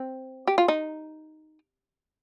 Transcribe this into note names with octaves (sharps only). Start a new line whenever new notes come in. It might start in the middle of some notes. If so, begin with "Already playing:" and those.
Already playing: C4
G4
F4
D#4